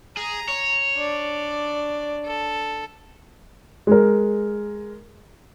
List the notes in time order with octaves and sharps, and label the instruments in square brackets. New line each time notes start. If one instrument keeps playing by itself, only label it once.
[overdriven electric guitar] G#4 [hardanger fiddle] A#5
[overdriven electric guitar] C#5
[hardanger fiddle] D4 D5
A4
[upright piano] G#3 A#4